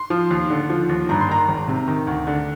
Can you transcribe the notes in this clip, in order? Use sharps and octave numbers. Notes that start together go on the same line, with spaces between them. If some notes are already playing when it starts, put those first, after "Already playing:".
Already playing: C6
F3
D#2
D3
F3
D#2
G2 A#5
C6
D#3 A#5
G#1
C3
D#3
D2
D3